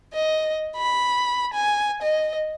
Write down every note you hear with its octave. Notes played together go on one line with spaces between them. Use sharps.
D#5
B5
G#5
D#5